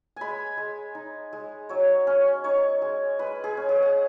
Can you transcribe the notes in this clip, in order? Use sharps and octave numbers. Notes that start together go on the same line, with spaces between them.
G#3 G#5 B5
G#3
D#4
G#3
F#3 C#5
C#4
D#4 C#5
G#3
G#3 B4
G#4
C#4
G#4
F#5